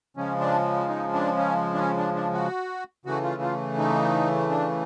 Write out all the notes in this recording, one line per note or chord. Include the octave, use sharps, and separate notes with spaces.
C#3 F3 G#3 C#4
D4
D#4
D4
C#4
D4
C#4
D4
D4
F#4
C#3 E3 A3 F#4
F4
F4
D#4
D4